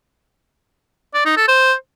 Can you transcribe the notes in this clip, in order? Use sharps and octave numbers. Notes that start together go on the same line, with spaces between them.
D5
D#4
A4
C5